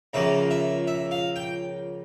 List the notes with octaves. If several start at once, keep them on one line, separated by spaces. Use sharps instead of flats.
C#2 C#3 F3 A#3 E5
E5
E5
F5
G5